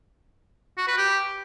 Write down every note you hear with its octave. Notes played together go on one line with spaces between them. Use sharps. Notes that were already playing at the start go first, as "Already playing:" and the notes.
F#4
B4
G4